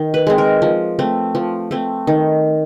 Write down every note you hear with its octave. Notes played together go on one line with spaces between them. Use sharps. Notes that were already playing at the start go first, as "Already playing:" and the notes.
Already playing: D#3
B4
G#3 C4
A#4
F3
A3 C4
F3
A3 C4
D#3